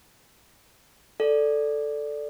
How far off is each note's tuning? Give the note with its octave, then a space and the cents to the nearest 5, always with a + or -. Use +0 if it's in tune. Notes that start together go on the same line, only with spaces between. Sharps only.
A4 +0 D5 +0